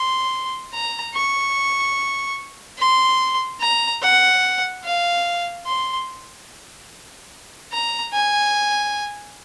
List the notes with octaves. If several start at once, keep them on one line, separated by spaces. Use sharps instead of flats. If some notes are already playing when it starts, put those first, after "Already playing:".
Already playing: C6
A#5
C#6
C6
A#5
F#5
F5
C6
A#5
G#5